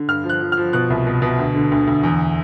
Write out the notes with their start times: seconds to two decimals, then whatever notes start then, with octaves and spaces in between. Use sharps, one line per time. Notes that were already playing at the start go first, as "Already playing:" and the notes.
Already playing: D3
0.08 G2 F6
0.24 F3
0.29 F#6
0.41 F3
0.52 F3 F6
0.73 B2 F#6
0.90 C2
1.07 B2
1.22 B2
1.38 D2
1.55 D3
1.72 D2
1.87 D2
2.03 E2